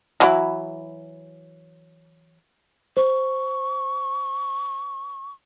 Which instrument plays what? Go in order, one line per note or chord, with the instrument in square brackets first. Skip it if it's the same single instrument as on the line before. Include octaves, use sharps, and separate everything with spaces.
[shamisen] E3 F#3 E4
[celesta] C5 [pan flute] C#6